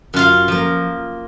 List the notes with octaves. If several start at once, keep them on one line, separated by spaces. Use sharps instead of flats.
F#2 F4 F5
F3 A#3